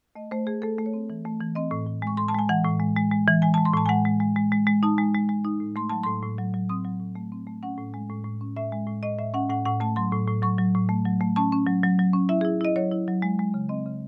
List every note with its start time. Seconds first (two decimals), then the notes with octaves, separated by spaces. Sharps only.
0.15 A3 D#5
0.31 A3 C5
0.47 A3 G#4
0.62 A3 A4
0.78 A3
0.86 C#5
0.93 C4
1.10 E3
1.25 A3
1.40 E3
1.55 C4 D#5
1.71 A2
1.86 A2
2.02 G#3 C#6
2.17 A2 C6
2.28 A5
2.34 G#3 G#5
2.49 E3 F#5
2.65 A2
2.80 G#3
2.97 G#3
3.11 G#3
3.28 E3
3.42 G#3 G#5
3.54 A5
3.58 G#3
3.65 C6
3.74 A2 A5
3.86 G#5
3.89 G#3 F#5
4.05 G#3
4.20 G#3
4.36 G#3
4.52 G#3
4.67 G#3
4.83 D#4 A5
4.98 G#3
5.14 G#3
5.29 G#3
5.44 D#4
5.60 A2
5.76 A3 C6
5.89 F#3 A5
6.03 A2 C6
6.23 A2
6.38 F#3
6.54 F#3
6.69 C4 D#6
6.84 F#3
7.00 A2
7.15 A3
7.32 C4
7.47 A3
7.63 C#4 F#5
7.78 A2
7.94 G#3
8.10 A2
8.24 A2
8.41 C#4
8.56 A2 E5
8.72 G#3
8.87 A2
9.03 A2 D#5
9.19 A2 E5
9.34 C#4 F#5
9.50 A2 F#5
9.66 A2 F#5
9.80 A3 A5
9.96 F#3 C6
10.12 A2
10.28 A2
10.42 F#3 C#6
10.58 F#3
10.75 A2
10.89 A3
11.05 F#3
11.21 A3
11.36 C#4 A5
11.52 C#4
11.67 F#3
11.83 F#3
11.99 F#3
12.13 C#4
12.29 E4 E5
12.41 G#4
12.45 E4
12.61 E4 D#5
12.76 F#3 C#5
12.91 E4
13.08 F#3
13.22 G#3
13.39 G#3
13.54 C#3
13.69 C4 D#5
13.85 C#3